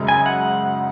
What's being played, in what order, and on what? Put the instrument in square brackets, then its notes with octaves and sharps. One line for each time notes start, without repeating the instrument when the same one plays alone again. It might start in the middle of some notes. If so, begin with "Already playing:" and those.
Already playing: [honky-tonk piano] F#2 C#3 G#3 D#4
[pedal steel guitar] G#5
F#5